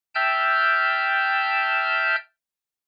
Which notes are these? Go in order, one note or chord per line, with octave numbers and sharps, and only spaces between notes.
E5 G5 A5 E6 F6 G6